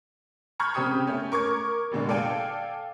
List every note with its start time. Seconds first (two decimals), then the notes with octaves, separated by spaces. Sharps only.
0.59 A#5 B5 C#6 F6 G6 G#6
0.74 C#3 C4 G4 D#6 C#7
1.07 A3 C#4
1.32 A#4 C#6 D6 G#6
1.91 F1 A#2 D3 G#3
2.08 A4 D5 F5 G5 G#5